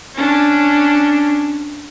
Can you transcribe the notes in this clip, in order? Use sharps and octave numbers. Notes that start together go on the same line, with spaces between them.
C#4 D4